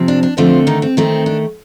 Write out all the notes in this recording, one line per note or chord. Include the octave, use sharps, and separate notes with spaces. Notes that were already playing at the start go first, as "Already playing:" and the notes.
Already playing: C3 F3 C4
D4
D4
D3 F3 A3 C4 F4
D#3 D#4
C4
D#3 A3 C4
D4